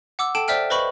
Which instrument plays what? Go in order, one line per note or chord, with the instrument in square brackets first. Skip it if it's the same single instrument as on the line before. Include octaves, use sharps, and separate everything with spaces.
[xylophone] F#5 D6 E6
A4 G5 A5 D7 E7
C5 D5 E5 G5 F6 D7
B4 C5 D#5 B5 C#6 F#7